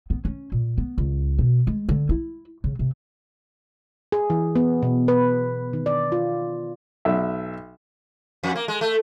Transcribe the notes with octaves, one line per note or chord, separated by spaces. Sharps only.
B3
C#4
A#2
B3
C#2
B2
G#3
D3
E4
C#3
C3
G#4
E3
B3
B2
B4
D#3
D5
F4
B1 E5
F2
A#3
G#3
A3